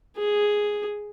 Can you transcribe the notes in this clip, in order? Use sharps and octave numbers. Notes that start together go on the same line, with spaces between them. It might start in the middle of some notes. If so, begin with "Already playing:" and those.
G#4